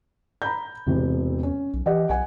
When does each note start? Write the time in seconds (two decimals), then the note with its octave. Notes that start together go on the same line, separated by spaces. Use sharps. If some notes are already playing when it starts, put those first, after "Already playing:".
0.42 A#5 B5 G6
0.86 E1 E2 A2 C3
1.43 C#4
1.74 B1
1.86 E3 G4 D#5 F#5
2.09 B1 F#5 G#5